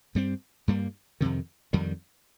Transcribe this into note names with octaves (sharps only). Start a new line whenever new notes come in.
G2 G3 C4
G2 G3 A#3
F2 C3 D#3
F2 D#3 G3